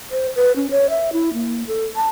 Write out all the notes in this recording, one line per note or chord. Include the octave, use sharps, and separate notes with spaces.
C5
B4
C#4
C#5
E5
E4
A#3
A4
A5